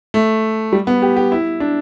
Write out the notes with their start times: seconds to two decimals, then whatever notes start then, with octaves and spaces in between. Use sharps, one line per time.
0.14 A3
0.72 G3
0.87 B3
1.02 G4
1.16 G4
1.32 E4
1.60 D4